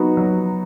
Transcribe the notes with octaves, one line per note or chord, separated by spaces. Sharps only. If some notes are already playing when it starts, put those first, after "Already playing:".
Already playing: F#3 B3 D#4 F#4
F#3